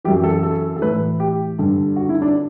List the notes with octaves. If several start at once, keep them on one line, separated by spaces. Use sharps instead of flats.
F#2 E3 G4
A4
A4
A4
A2 E3 B4
G4
G2 D3
F#4
E4
D4